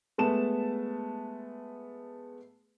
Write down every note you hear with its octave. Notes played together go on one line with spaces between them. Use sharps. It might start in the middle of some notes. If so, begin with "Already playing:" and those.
G#3 A3 B3 A5 E7